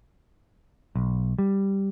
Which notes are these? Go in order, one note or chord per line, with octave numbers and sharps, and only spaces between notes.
B1
G3